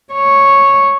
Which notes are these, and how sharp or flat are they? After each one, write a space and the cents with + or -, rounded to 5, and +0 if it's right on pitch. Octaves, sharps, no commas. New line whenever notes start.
C#5 -5